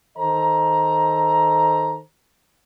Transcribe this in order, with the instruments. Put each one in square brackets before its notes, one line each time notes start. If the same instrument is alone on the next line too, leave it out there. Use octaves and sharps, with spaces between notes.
[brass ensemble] D#3 A4 C5 D#5 A#5